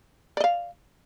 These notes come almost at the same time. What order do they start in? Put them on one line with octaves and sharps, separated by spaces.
D5 D#5 F5